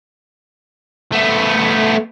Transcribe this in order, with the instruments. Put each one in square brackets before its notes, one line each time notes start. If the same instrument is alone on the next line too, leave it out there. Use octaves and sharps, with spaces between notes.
[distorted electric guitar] A3 B3